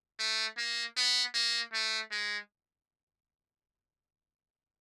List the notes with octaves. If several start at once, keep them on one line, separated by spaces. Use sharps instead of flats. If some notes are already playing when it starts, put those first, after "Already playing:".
A3
A#3
B3
A#3
A3
G#3